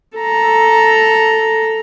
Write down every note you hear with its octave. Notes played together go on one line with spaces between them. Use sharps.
A4 A#5